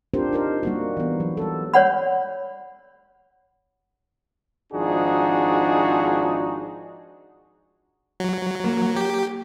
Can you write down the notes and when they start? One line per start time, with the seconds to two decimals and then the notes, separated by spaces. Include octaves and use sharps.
0.14 C4 D4 F4 G4 A#4 C5
0.33 D#4 A#4 C5
0.63 G3 A#3 F#4
0.97 E3 B3
1.20 F#3
1.37 G3 A4
1.74 C#5 D5 F#5 B5
4.73 G#1 F3 D4 D#4 F#4 G#4
8.20 F#3
8.64 A#3
8.96 G4